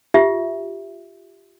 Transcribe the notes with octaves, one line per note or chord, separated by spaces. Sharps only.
F4 G4 E5